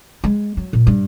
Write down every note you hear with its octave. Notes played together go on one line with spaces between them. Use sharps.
G#3
F#3
A#2
G2